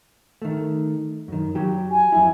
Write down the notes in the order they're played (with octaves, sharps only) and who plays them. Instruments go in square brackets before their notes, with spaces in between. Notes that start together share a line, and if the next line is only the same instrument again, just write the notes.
[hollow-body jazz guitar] D#3 A3
F#2 D#3
F#3 G4
[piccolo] G#5
[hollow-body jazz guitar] F2 E4